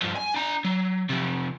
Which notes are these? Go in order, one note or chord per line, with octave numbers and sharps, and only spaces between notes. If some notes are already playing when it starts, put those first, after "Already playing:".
G2 F3
G#5
D4 A#5
F#3
C3 F3